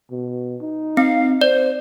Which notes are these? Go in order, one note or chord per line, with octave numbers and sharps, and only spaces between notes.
B2
D#4
C4 F5
C5 D5